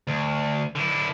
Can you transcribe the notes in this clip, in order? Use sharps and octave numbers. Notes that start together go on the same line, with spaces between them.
D2
D3 E4